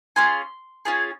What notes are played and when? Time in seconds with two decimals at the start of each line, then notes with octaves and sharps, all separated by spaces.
0.16 C#4 F4 G#4 C6
0.85 C#4 F4 G#4